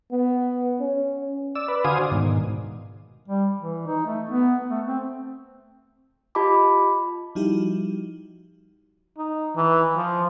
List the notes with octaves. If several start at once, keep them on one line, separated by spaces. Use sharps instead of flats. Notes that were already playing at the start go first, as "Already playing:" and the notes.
B3
C#4
D5 E6
B4 D5
D3 F#4 C5 F5 G#5 D#6
D5
G#2 B2 D#3
G3
E3
D#4
A3
B3
A3
C4
F4 G4 D#5 A5 B5 D6
F3 G3 D#4 E4 F#4 G4
D#4
E3
F3